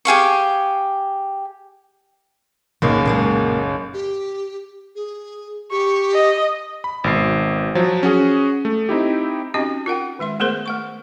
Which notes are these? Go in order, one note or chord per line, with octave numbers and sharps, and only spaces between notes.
G4 G#4 F5 C#6
F#1 B1 A#3
A#2 G#3 A#3
G4
G#4
G4 C#6
D#5
B5
G#1 B2 C7
F3 F#3 C5
C#4 F#4 G#4
A3
C4 D#4 E4 G4
C4 C#4 D#4 F#4 G4 D#5
F4 A#4 F#5 G5
D#3 G#3 E5 C6
A3 B3 G#4 A#4 C5 C6
A3 F#5 C#6